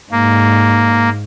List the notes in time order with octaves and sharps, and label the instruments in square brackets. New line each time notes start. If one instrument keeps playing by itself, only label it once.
[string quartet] G#2 [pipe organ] A#3